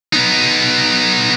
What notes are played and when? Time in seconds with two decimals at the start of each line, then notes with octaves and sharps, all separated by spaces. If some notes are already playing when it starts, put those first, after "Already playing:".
0.13 B3 D#4